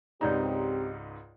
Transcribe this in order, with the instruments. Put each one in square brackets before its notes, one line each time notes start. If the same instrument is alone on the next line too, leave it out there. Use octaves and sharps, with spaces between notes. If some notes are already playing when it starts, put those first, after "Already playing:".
[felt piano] C#2 G#2 D#4 [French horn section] C4 G4 [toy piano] C#5 D5 A#5